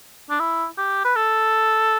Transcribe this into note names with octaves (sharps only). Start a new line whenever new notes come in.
D4
E4
G4
B4
A4